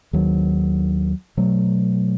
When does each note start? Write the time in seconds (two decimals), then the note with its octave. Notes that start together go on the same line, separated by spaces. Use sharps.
0.13 D#2 D#3 F#3
1.37 B2 F#3 A3